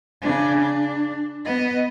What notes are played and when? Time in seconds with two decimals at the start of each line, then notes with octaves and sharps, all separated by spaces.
0.22 C#3 D4
0.60 D4
1.45 B3 D#5